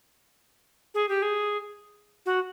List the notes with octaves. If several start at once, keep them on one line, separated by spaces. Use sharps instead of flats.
G#4
G4
G#4
F#4